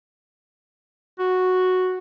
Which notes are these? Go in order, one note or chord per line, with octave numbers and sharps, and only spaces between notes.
F#4